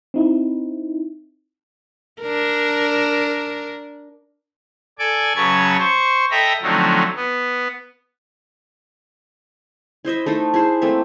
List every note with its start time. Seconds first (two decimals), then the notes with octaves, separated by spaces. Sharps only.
0.14 C4 D#4 E4
2.21 D4 A#4
4.99 A4 D5 G#5 D6
5.36 C#3 F#3 B4 C#5 A5 G#6
5.79 C5 C#6
6.31 A4 D#5 E5 G5 A#5 B5
6.62 D3 F3 F#3 A3 C4 D#4
7.16 B3
10.05 E4 C5 D#5 E5
10.26 A3 D#4 A4 C5
10.54 E4 G#4 C5
10.82 A3 A#3 C4 E5